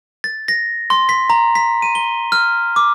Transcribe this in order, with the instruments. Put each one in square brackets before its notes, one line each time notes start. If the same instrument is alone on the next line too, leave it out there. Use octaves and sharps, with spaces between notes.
[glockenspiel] A6
A#6
C6
B6
A#5
B6
D#7
G7
F6
D6